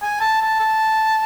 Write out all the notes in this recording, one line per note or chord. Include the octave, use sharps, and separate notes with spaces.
G#5
A5
A5
A5